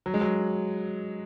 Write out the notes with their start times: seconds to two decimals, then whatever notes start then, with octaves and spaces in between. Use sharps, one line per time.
0.06 F#3
0.14 G#3
0.21 F#3